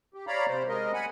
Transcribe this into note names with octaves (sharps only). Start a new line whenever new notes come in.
G4
C#5 D5 F5 A#5 B5
C3 C5
G#3 A#4 D#5
F#5 G#5 B5